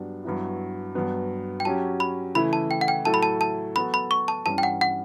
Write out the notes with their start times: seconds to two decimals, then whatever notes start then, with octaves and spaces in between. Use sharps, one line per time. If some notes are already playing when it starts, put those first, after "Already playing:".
Already playing: G2 F#3 B3 D4 G4
0.24 G2 F#3 B3 E4
0.95 G2 F#3 B3
1.60 G5
1.65 F#3 C#4 G4 A5
2.00 B5
2.35 C#3 E3 A3 E4 B5
2.53 A5
2.71 G5
2.81 F#5
2.88 G5
3.05 A2 F#3 A3 E4 A4 A5
3.14 B5
3.23 A5
3.41 A5
3.75 F#3 B3 F#4 A4 B5
3.94 B5
4.11 C#6
4.28 A5
4.46 G2 E3 G3 C#4 A5
4.58 G5
4.63 F#5
4.81 F#5